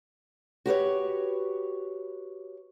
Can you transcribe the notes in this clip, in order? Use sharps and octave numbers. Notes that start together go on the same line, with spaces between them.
F#4 G4 B4 C#5